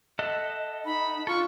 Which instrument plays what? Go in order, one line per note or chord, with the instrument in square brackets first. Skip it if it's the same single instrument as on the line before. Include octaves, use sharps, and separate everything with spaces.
[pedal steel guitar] A4 E5 F#5 [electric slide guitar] D#5
[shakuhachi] D#4 [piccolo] B5
[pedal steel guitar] D4 A4 [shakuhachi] F4 [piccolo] C#6